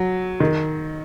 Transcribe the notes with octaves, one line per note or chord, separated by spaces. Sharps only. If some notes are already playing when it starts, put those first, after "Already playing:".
Already playing: F#3
D#3